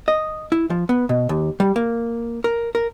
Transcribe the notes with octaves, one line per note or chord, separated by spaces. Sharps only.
D#5
E4
F3
B3
B2
D#2
G3
A#3
A#4
A#4